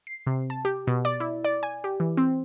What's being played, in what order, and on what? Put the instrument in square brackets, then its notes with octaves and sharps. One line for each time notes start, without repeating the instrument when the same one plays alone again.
[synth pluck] C7
C3
A5
G4
B2
D5
E4
D5
G#5
G4
E3
C4